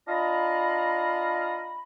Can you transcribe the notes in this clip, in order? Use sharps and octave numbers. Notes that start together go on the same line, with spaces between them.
D4 F4 D#5 F5 A#5 B5